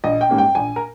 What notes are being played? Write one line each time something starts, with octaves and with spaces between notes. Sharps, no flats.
A#1 D#5
G5
G#2 G3 A#3 C#4
G5
A#1 G#5
A#4